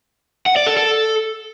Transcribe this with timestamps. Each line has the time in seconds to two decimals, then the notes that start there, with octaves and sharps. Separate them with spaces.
0.46 F#5
0.56 D5
0.67 A4
0.77 A4